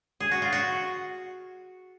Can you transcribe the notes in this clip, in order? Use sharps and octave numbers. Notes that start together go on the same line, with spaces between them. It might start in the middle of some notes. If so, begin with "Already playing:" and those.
G#4
F#4
F4
F#4